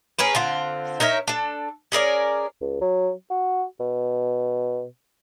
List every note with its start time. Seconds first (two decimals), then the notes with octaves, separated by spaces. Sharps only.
0.19 C#4 G#4 A#4 B4
0.35 D3 C4 F4
1.00 D#4 A#4 C#5 E5
1.28 D4 A4
1.92 C#4 G#4 A#4 D5
2.61 C#2
2.81 F#3
3.30 F#4
3.80 B2